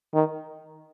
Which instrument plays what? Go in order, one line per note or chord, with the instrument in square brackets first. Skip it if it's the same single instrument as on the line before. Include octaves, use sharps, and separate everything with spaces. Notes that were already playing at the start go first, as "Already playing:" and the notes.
[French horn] D#3